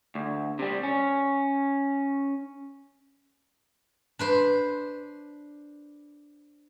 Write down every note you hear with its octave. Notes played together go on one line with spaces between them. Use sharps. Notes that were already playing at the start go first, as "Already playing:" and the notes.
D2
C3 G3
C#4
D4 B4 C5